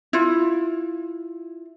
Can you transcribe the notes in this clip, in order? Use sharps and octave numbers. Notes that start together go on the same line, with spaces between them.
E4 F4